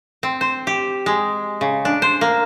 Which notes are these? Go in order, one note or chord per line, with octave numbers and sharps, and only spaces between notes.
C4
C5
G4
G#3
C#3
D4
C5
A#3